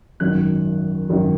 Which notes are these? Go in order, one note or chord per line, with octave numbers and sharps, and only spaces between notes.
G#1 F#2 D#3 F#3 F#6
G#1 F#2 D#3 F#3